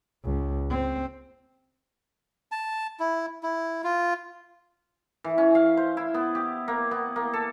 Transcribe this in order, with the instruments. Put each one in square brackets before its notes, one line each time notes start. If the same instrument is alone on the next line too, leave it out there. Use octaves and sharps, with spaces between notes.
[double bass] C#2
C4
[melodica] A5
E4
E4
F4
[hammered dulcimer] E3
C#4
F5
C5
E4
B3
G4
A#3
B3
A#3
A4